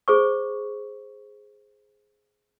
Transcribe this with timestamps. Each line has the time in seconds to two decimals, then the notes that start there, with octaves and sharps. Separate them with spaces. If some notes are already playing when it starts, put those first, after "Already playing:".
0.08 G#4 C5 C#6